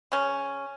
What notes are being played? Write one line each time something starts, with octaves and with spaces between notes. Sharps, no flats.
C#3 C#4